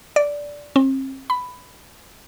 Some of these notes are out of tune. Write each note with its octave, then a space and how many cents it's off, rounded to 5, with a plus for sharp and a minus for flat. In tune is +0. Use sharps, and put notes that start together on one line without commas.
D5 -10
C4 +40
B5 +10